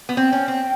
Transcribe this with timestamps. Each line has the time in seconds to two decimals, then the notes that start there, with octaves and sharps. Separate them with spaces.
0.09 B3
0.17 C4 G5
0.32 C#4
0.48 C4